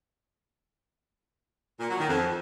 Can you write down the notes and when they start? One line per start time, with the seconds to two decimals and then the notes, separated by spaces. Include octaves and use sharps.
1.80 A#2
1.90 F#3
1.99 D#3
2.09 F2